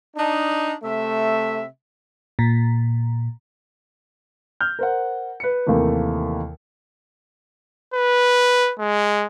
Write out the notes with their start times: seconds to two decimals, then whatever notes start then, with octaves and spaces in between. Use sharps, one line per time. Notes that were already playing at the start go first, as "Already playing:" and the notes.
0.16 D4 D#4
0.83 C3 A3 E5
2.39 A#2
4.61 F6 G6
4.79 A#4 C5 F#5
5.40 B4 C#7
5.66 D#2 C3 E3 A3 A#3
7.94 B4
8.79 G#3